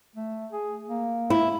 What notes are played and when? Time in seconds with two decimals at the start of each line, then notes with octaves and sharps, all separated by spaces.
0.16 A3
0.52 G#4
0.88 A#3
1.30 E4